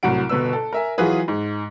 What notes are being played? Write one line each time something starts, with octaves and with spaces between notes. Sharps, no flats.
C2 A2 F#3 F#5 D7
G1 B2 B4 E6
A4
A#4 E5 G#5
E3 F#3 F4 F#4 G#4 B4
G#2